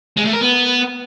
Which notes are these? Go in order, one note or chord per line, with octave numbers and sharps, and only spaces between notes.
G#3
A3
A#4
B3